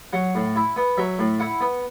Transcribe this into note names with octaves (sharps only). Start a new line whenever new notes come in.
F#3 F#5
A2
E4
B3
F#3 E5
A2
E4 F#5
B3